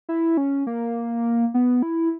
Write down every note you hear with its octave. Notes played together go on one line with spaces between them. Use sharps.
E4
C#4
A#3
B3
E4